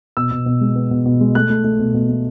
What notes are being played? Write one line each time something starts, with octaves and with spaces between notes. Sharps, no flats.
B2 E6
B2
B2
G#3
B3
B2
B2
G#3
A3 F#6
A3
A3
B2
B2
A3